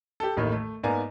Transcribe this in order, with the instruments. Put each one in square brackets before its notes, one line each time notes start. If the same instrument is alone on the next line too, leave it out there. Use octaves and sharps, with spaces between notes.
[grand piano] G4 A4
A1 D#2 A2 D#3
A3
G#2 A#3 B3 D5 G#5 A#5